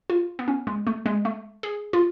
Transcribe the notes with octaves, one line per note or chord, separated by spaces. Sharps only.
F4
B3
C#4
G#3
A3
G#3
A3
G#4
F4